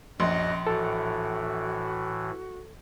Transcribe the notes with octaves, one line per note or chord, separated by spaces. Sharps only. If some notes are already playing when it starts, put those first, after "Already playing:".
A#1 F#2 F#4 D#5 C6
A2 E3 F#4 A4